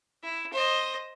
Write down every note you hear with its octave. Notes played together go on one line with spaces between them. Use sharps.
E4
C5 D#5